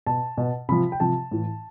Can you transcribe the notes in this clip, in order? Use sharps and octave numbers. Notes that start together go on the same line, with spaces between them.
B2 A5
B2
C3 F3 B5
G5
C3 F3 A5
A2 E3